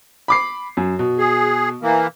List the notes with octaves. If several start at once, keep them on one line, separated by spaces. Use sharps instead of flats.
B5 D6 C7
F#2
B2
G#4
E3 A#3